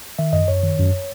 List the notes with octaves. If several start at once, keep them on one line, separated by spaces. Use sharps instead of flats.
D#3 E5
F#2 D#5
F#2 C#5
D#3
F#2